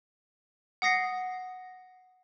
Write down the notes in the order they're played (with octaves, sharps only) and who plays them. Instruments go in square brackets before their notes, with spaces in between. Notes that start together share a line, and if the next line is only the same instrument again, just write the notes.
[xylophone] F#5 D#6 A#6 C7